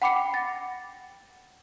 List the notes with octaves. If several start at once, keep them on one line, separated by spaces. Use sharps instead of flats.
F#5 G5 B5 D6 C7 C#7
F#5 A6 A#6